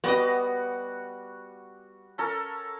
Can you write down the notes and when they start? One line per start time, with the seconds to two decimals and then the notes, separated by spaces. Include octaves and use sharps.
0.04 G3 B3 F#4 D#5 D6
2.18 C#4 A4 A#4